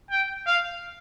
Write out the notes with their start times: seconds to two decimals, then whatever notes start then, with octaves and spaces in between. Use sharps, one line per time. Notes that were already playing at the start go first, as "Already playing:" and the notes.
0.10 G5
0.47 F5